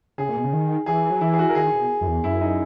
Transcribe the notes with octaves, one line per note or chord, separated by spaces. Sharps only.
C#3 G#4
A#2
B2
C#3
D#3
E3 G#4
F#3
E3 E4
G#4
F#4
A#4
D#3 G#4
B2
F#2
E2
F#2 E4
D#4